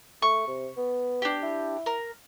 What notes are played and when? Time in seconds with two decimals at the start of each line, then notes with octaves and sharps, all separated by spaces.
0.22 A3 C#6
0.47 C3
0.77 B3
1.22 D4 G4
1.43 E4
1.86 A#4